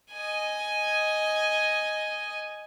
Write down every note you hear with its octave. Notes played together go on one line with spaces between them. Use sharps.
D#5 G#5